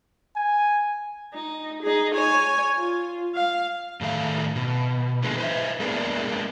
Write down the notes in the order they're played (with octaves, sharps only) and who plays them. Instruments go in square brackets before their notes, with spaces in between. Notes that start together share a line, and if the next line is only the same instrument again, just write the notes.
[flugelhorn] G#5
[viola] D#4
D#4 G#4
C#5 G#5
F4
F5
[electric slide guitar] A2 D#3 A3 F5
B2
A#2 D3 E3 G#3
B4 C5 E5
G#3 A#3 B3 D4 E4 G#4